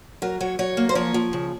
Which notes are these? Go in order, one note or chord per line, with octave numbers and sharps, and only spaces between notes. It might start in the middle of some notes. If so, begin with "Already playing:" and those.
F#3 A#4
F#3 C#5
F#3 C#5
A#3
C5
F3 C#5
F3
C#3